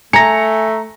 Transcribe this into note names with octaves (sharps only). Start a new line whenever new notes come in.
A3 G#5 A#5 A#6 C#7